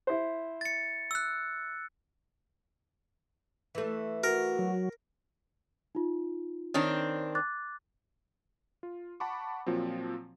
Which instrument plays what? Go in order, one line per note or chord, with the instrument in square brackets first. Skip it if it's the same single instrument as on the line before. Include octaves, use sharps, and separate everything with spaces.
[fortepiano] E4 C5
[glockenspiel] A6 C#7
E6 F#6
[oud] E3 A3
[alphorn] F#4 [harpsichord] A#4
[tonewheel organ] F#3
[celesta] D#4 F4
[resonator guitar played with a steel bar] D#3 C4 D4 [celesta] C#5
[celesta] D6 F#6 A6
[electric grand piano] F4
F#5 A5 B5 C#6 D6
A#2 F3 F#3 C4